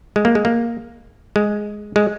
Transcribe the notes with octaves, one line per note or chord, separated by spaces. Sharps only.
G#3
A#3
G#3
A#3
G#3
G#3